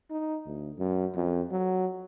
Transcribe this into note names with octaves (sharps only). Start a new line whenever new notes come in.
D#4
D2
F#2
F2
F#3